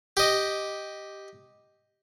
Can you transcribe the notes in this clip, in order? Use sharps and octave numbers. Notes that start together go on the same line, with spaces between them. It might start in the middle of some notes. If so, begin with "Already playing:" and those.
G4 D#5